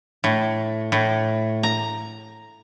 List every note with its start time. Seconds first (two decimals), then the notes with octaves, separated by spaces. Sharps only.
0.24 A2
0.92 A2
1.63 A#5